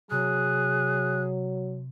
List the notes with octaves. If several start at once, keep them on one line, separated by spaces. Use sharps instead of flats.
C3 F#3 G#4 F#6